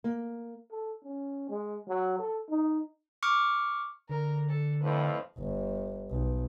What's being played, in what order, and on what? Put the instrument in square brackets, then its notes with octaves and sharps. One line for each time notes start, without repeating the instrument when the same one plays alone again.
[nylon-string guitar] A#3
[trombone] A4
C#4
G#3
F#3
A4
D#4
[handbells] C#6 D6 F6 C#7
[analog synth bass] D3 [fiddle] A#4
[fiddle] A4
[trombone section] F2 A2 [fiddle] B4
[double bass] G1
B1